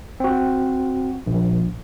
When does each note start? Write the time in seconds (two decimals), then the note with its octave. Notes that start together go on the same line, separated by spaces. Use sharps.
0.20 C4 F#4
1.26 A#1